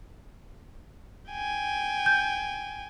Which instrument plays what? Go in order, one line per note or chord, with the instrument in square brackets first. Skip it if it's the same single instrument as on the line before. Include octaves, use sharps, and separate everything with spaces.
[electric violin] G5 G#5
[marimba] G6